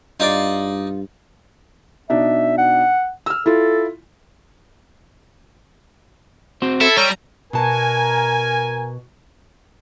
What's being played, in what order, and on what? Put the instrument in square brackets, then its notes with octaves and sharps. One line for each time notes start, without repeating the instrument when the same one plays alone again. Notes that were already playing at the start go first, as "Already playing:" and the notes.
[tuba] G2 [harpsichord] D#4 D5 [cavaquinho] F4 F5
[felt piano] B2 D4 D#4 [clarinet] E5
[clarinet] F#5
[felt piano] E6 F6
[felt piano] E4 F4 [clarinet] A4
[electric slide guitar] C4 F#4 C5
[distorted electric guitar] E4 [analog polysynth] A4
[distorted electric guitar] G3 [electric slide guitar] C#5 [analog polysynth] A#5
[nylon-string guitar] B2 A5 [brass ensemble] A#4 G#5